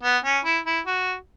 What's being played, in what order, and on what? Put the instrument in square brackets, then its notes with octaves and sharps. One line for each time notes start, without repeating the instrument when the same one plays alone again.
[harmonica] B3
C#4
E4
E4
F#4